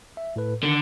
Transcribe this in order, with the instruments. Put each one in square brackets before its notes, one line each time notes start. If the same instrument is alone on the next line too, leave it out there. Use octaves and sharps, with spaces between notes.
[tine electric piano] E5
A2 A4 B4
[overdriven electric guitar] D3 [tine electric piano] D#3